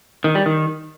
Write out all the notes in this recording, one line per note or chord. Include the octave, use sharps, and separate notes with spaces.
D#3
G3
D#3